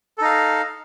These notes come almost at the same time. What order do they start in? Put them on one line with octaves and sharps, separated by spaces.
A4 D#4 F5